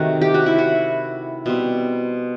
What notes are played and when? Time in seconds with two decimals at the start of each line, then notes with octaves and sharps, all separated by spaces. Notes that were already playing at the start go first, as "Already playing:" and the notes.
Already playing: C3 D#3 A3 F#4
0.21 G4
0.34 F#4
0.46 E4
0.58 F#4
1.46 B2 G3 C4